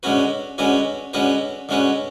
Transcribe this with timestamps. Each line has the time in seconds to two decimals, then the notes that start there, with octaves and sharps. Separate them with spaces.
0.03 D3 G#3 C#4 F#4 B4
0.58 D3 G#3 C#4 F#4 B4
1.13 D3 G#3 C#4 F#4 B4
1.69 D3 G#3 C#4 F#4 B4